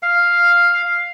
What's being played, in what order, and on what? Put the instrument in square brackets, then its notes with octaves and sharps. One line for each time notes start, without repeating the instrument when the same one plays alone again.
[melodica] F5